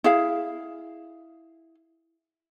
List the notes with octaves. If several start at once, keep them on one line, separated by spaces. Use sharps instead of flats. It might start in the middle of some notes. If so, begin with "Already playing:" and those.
E4 G#4 F5